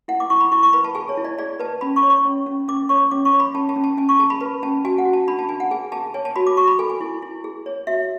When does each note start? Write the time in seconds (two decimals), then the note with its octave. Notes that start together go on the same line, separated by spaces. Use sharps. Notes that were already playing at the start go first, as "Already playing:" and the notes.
0.08 E4 F#5
0.20 D6
0.30 E4 C#6
0.41 B5
0.52 E4 C#6
0.63 C#6
0.73 B4 B5
0.84 A5
0.95 G#4 G#5
1.09 C#5
1.17 E4
1.25 D5
1.39 G#4 D5
1.60 B4 A5
1.81 C#4 B5
1.96 C#6
2.03 C#5
2.10 C#6
2.25 C#4
2.46 C#4
2.68 C#4 D6
2.89 C#5 C#6
3.11 C#4 D6
3.25 C#6
3.33 C#5
3.40 B5
3.55 C#4 A5
3.69 A5
3.76 C#4
3.84 A5
3.97 C#4 G#5
4.09 C#6
4.19 G#4 A5
4.30 B5
4.41 B4 B5
4.63 C#4 A5
4.85 F#4 G#5
4.98 F#5
5.05 F#4
5.13 A5
5.27 D4 B5
5.39 A5
5.49 D4 G#5
5.60 F#5
5.71 G#4 G#5
5.92 G#4 A5
6.14 C#5 G#5
6.25 A5
6.36 F#4 B5
6.47 D6
6.57 F#4 C#6
6.68 B5
6.79 A4 G#5
6.90 G#5
7.01 E4
7.22 E4
7.44 G#4
7.66 C#5
7.87 F#4 E5